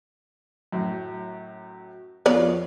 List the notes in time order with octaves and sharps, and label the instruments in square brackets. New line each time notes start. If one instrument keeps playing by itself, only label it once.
[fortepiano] F#2 A2
[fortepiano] F2 F4 [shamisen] B3 C#5 D5